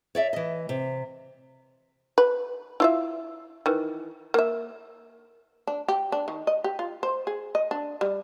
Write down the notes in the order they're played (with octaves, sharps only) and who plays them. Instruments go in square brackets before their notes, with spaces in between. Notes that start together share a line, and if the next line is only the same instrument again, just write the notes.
[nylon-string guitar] C#5 D5 E5
E3 D#5
C3
[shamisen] B4
E4 F4 E5
D#3 E3
A#3 E5
D4
G4
D4
D#3
D#5
G4
F4
C5
G#4
D#5
D4
G3